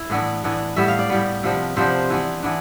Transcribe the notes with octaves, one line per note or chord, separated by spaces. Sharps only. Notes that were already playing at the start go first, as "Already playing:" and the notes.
Already playing: E4
A2 E3 B3 D4
A2 E3 B3 D4
A2 G3 B3 E5
F5
D5
A2 G3 B3
C3 F3 B3 D4
C3 F3 B3 D4 C5
E3 B3 D4
E3 B3 D4